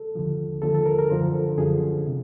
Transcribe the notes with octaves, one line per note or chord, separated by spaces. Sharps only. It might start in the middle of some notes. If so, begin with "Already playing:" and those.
Already playing: A4
D#2 D3 F3
D#2 D3 F3 A4
A4
A#4
A#4
F#2 D3 F3 C5
A4
F#2 D3 F3 G#4
C3